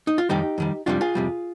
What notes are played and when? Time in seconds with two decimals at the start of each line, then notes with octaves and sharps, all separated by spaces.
0.07 D#4
0.18 F4
0.29 F2 D#3 G3 D#4 G4
0.58 F2 D#3 G3
0.86 F2 C3 G3 D4 F4
1.01 F4 G#4
1.15 F2 C3 G3